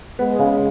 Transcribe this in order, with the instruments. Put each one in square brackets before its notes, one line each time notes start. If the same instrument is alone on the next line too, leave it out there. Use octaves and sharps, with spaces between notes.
[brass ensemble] G#3 [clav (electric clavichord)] B3
[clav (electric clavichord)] C#3